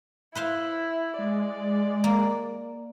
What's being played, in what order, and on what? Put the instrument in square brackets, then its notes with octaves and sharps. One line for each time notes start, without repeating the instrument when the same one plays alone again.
[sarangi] E4 [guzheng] B4 C5 F5
[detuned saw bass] G#3 [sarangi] D5
[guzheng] A#3